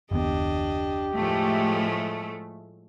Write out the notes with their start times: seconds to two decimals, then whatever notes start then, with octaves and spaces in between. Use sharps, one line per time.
0.11 F#1 D#2 B3 D4 G4 D#5
1.16 A2 F3 G#3 A3